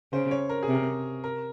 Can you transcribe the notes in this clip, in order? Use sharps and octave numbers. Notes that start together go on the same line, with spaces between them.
C#3 C5
C#5
A#4
G#4
C3
A#4
A#4